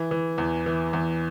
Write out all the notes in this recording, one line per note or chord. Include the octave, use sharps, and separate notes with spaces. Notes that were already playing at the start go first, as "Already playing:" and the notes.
Already playing: E3
E3
E2
E3
E2